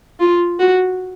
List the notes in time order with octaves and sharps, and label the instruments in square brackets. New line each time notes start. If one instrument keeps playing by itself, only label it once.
[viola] F4
F#4